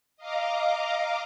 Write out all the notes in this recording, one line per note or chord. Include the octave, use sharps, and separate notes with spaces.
D#5 F5 A#5 D6